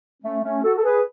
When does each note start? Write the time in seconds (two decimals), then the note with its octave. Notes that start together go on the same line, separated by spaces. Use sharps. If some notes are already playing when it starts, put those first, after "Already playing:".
0.22 A3 C#4
0.43 A3 C#4
0.63 F#4 A4
0.77 A4
0.83 G#4 B4